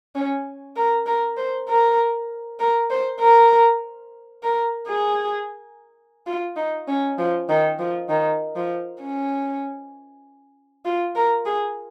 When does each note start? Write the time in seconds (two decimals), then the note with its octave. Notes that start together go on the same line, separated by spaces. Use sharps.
0.15 C#4
0.76 A#4
1.06 A#4
1.37 C5
1.68 A#4
2.60 A#4
2.90 C5
3.20 A#4
4.43 A#4
4.88 G#4
6.26 F4
6.56 D#4
6.88 C#4
7.18 F3
7.49 D#3
7.79 F3
8.09 D#3
8.56 F3
9.02 C#4
10.85 F4
11.15 A#4
11.45 G#4